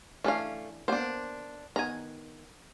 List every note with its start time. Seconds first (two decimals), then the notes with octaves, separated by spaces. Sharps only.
0.24 E3 A3 C#4 D4 F5
0.88 A#3 B3 D4 C5
1.76 D#3 B3 G#5 A#5